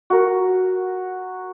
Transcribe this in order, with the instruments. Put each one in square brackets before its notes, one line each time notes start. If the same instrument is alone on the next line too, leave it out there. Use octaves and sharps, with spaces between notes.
[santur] F#4 A#4